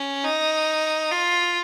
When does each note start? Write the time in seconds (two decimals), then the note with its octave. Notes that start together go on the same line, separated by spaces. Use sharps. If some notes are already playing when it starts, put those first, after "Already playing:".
Already playing: C#4
0.24 D#4
1.11 F4